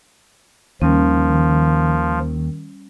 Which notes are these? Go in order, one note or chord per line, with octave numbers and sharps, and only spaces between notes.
D#2 D#3 F3 G3 C#4